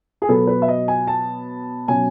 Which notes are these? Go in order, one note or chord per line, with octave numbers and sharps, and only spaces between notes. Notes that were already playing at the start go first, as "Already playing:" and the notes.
G#4
B2 F#3 B3 A4
B4
E5
D#5
G#5
A5
B2 F#3 C#4 G#5